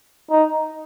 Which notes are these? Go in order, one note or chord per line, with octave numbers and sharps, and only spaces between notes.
D#4